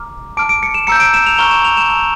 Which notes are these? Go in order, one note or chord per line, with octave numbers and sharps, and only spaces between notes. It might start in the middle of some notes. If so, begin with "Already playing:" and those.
Already playing: A#5 D6 F6
A5 D6 F6 D7
D7
C#7
E7
A#5 E6 G6 C#7
D7
E7
F7
A#5 C#6 F6 G7
E7
F7
E7
A5 E6 G6 F7